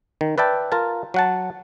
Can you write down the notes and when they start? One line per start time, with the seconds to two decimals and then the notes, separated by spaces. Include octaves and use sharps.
0.21 D#3
0.38 B4 D5 E5 G5 A5
0.72 F4 A#4 A5
1.14 F#3 F#5 A5